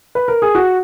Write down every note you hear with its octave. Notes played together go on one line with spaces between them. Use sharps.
B4
A#4
G#4
F#4